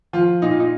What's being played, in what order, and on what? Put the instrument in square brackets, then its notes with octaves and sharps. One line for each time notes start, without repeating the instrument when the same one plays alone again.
[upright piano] F3 F4
A#2 D#4
F4
D#4